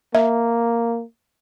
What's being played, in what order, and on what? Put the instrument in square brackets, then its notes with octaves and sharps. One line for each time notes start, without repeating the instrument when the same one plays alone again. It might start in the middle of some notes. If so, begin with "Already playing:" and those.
[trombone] A#3 [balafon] E5